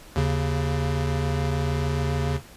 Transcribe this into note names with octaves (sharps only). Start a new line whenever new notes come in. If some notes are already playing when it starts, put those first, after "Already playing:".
D#2 C#3